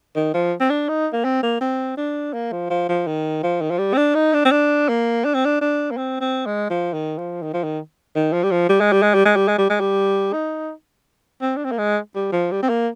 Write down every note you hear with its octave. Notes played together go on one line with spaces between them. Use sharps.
D#3
F3
C4
D4
D#4
A#3
C4
A#3
C4
D4
A#3
F3
F3
F3
D#3
F3
D#3
F3
G3
C4
D4
D#4
D4
C4
D4
A#3
D4
C4
D4
D4
A#3
C4
C4
G#3
F3
D#3
F3
D#3
F3
D#3
D#3
F3
G3
F3
G3
G#3
G3
G#3
G3
G#3
G3
G#3
G3
G#3
G3
D#4
C4
D4
C4
A#3
G#3
G3
F3
G3
C4
A#3